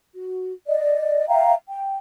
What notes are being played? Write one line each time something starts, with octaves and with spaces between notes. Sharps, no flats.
F#4
D5 D#5
E5 F5 G5 A#5
G5